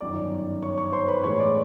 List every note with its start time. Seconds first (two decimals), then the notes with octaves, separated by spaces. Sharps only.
0.01 G1 F#2 D#3 D5 D6
0.62 C#5 C#6
0.78 C#5 C#6
0.92 C5 C6
1.08 B4 B5
1.23 A2 E3 G#3 C#4 C#5 C#6
1.39 D5 D6